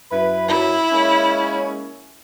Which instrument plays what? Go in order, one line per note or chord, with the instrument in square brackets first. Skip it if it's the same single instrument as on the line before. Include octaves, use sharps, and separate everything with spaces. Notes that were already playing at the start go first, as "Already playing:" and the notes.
[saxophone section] F#2 E4 B4
[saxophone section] F#2 [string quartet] E4
[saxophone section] G#3 A#3 C#4